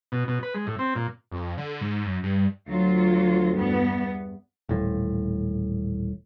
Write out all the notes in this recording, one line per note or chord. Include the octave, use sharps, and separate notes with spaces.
B2
B2
B4
G#3
A2
C4
A#2
F2
D3
G#2
F#2
G2
D2 F#3 F4
E2 G2 B3
D#1 A1 A2